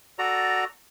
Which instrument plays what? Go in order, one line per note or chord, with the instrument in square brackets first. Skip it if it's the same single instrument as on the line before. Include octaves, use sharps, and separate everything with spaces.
[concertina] F#4 A4 D5 A#5